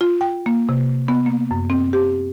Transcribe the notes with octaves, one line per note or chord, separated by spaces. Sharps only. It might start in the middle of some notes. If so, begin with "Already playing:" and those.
F4
G5
A#3
C3
B3
A#3
F#2
C4
G4